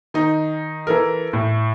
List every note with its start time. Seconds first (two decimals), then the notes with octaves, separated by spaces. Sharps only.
0.14 D#3 D#4
0.87 E3 A4 A#4
1.33 A2